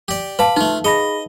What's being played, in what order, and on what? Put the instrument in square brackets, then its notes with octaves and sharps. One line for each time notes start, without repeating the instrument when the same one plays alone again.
[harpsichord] G4 D5
[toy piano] B4 F5 A5 [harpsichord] B5 D6
[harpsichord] A3 F4 [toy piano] D#4
[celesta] G#4 B5 A#6 [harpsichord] D#5